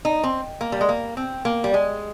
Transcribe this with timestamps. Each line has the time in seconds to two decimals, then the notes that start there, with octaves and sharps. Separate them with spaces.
0.05 D#4
0.24 C4
0.61 A#3
0.72 G3
0.81 G#3
0.89 A#3
1.17 C4
1.45 A#3
1.64 G3
1.74 G#3